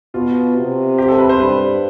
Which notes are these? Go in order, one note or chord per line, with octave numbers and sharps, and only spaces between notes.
B2 F4
C3
G4
A4
B4
C5
G2 B4